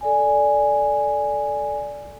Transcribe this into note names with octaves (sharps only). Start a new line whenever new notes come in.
A4 D5 G#5